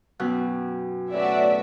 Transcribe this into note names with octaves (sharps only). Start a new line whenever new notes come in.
F#2 B2 G5 F#6
A2 C#3 B3 F#4 D5 E5